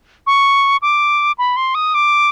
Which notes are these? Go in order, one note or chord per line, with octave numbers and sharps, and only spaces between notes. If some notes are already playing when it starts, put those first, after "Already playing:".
C#6
D6
B5
C6
D#6
D6